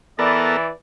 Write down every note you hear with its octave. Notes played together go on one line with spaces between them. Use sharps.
E3 B3 A4 A#4 D5